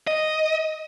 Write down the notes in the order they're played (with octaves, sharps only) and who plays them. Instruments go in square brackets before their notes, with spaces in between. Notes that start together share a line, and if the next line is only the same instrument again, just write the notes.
[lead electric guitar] D#5